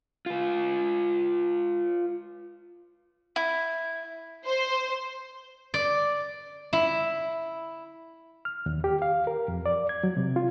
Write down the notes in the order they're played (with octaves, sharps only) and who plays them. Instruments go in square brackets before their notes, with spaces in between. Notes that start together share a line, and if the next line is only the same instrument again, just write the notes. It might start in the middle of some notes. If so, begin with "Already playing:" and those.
[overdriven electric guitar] F4 B4
[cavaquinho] E4
[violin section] C5
[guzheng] D5
E4
[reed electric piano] F6
D#2
G4
F5
A#4
F2
D5
G#6
F#3
C3
F4